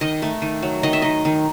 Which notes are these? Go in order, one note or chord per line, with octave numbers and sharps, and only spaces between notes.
D#3 D#5
A3
D#3
F#3
D#3 D#5
E5
D#3 D#5
D#3